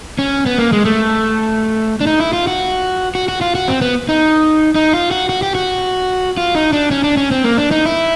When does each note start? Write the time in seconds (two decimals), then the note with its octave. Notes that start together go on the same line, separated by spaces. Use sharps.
0.19 C#4
0.46 B3
0.58 A#3
0.73 G#3
0.85 A3
2.01 D4
2.07 D#4
2.20 E4
2.33 F4
2.47 F#4
3.15 F#4
3.28 F#4
3.41 F4
3.55 F#4
3.68 C4
3.81 B3
4.09 D#4
4.75 D#4
4.93 F4
5.11 F#4
5.29 F#4
5.42 G4
5.55 F#4
6.37 F4
6.55 D#4
6.73 D4
6.91 C#4
7.04 D4
7.17 C#4
7.31 C4
7.44 A#3
7.57 D4
7.71 D#4
7.86 E4